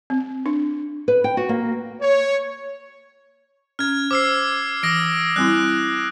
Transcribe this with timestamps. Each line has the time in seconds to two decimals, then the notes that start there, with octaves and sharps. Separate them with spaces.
0.10 C4
0.46 D4
1.08 B4
1.24 G5
1.37 F#4
1.49 A#3
2.01 C#5
3.79 C#4 F6 G#6
4.11 C5 D6 E6 C7
4.83 E3 D#6 A#6 D7
5.36 G3 C4 E4 F#6